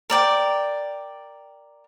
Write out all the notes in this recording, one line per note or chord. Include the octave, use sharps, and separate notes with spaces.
A#4 D5 G5